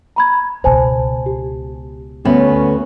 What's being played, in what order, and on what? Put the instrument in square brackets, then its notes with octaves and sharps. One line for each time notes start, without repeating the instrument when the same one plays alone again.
[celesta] A#5 B5 G#6
[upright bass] C#2 B2 [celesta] C5 G#5 A5
[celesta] G4
[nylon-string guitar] D2 B3 [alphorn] C#4